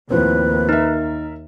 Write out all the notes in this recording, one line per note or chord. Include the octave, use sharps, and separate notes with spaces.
D#2 A2 F3 C4 B4
D#4 A#4 E5